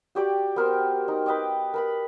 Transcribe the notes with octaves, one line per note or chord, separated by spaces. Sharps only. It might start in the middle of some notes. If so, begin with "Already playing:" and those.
F#4 G4 D5
B3 A#4 C5
D#4
B4 D#5 G5 D6
A#4 B4 B5